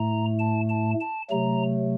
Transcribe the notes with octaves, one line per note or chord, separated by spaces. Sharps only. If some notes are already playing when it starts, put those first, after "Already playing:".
Already playing: A2 A3 A#5
A5
A5
A5
C3 F#3 A3 A#5